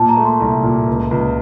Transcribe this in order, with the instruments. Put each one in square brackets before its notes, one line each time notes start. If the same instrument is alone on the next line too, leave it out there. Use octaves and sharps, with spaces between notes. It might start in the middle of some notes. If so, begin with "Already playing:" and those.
Already playing: [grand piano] A#2 [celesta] A5
[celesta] A#5
[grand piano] A3
[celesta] C6
[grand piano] C2
A#2
C#2
C#2